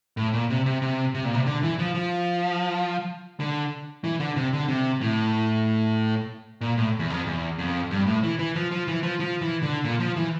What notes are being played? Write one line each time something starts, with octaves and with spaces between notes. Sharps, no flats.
A2
A#2
C3
C3
C3
C3
A#2
C3
D3
E3
F3
F3
D3
E3
D3
C3
D3
C3
A2
A#2
A2
E2
F2
E2
F2
G2
A2
E3
E3
F3
F3
E3
F3
F3
E3
D3
A#2
F3
E3